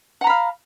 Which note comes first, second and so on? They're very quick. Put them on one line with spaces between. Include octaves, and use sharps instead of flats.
F#5 A#5 B5 F5